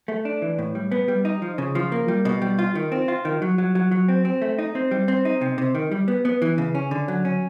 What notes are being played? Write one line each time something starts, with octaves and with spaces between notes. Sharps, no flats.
A3
D4
E3
A2
G3
B3
G3
D#4
F3
C#3
F3
A#3
G3
B2
G3
F4
D#3
C4
F4
D#3
F#3
F#3
F#3
F#3
C4
C4
A3
D#4
C4
G3
C4
D#4
C3
C3
D#3
G3
B3
B3
E3
C#3
C#4
D3
F#3
C#4